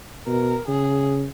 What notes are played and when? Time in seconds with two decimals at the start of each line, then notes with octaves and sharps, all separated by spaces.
0.27 B2 A#4
0.68 C#3 G#4